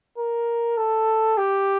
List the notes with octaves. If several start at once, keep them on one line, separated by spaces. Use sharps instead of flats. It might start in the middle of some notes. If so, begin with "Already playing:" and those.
A#4
A4
G4